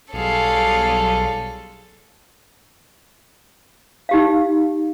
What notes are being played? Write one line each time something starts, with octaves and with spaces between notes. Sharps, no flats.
B1 G3 F4 G#4 A4 C#5 F5
D#4 G4 F5